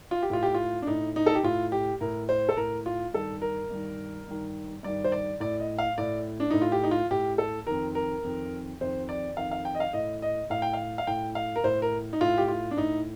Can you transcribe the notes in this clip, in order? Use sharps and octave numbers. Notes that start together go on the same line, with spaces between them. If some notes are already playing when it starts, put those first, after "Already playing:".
F4
G4
A2 F4
G4
F4
D4
A2 D#4
D#4
A4
G4
A2 F4
G4
A2 A#4
C5
A4
A2 A#4
F4
G2 D#3 A4
A#4
G2 D#3
G2 D#3
G2 D#3 D5
C5
D5
A2 D5
D#5
F5
A2 D5
D4
A2 D#4
F4
G4
D#4
F4
A2 G4
A4
F2 D#3 A#4
A#4
F2 D#3
F2 D#3 C5
D5
F2 D#3 F5
F5
G5
D#5
F5
A2 D#5
D#5
A2 F5
G5
F5
F5
A2 G5
F5
A#4
A2 C5
A#4
D#4
A2 F4
G4
F4
D4
A2 D#4